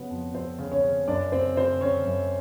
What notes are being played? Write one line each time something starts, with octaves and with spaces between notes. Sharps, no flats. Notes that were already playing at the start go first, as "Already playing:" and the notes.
Already playing: C#3 F#3 B3 B4
F2
F2 C4 C5
C#3
C#4 C#5
C#3
F#2 D4 D5
C#3 C4 C5
C#3 C4 C5
C#3 C#4 C#5
F#2